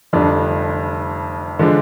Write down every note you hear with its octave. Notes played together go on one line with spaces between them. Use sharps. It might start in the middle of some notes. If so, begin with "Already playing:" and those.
F1 F2 D3 G3 D4
D3 F3 G#3 D4